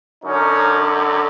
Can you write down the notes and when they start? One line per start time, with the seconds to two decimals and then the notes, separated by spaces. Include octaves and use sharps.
0.24 F#2 D3 C#4 D#4